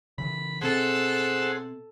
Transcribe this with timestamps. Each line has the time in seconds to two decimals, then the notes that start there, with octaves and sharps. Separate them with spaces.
0.18 C#3 E3 B5
0.62 B2 C4 G#4 A4 C5 F#5